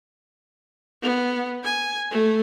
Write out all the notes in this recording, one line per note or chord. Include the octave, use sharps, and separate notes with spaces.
B3
G#5
A3